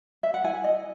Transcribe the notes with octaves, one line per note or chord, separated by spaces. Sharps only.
E5
F#5
E4 G#5
D#5